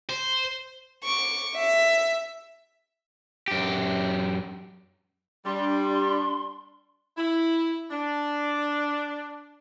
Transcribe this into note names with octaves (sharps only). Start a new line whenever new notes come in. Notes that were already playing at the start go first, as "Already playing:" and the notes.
C5
C#6 D6
E5
F#2 G4
G3 D4 C6
E4
D4